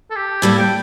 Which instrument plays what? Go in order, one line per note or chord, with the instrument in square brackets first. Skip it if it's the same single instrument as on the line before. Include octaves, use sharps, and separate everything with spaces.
[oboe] A4
G4
[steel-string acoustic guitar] A2 G3 A#3 [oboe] A4
[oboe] G5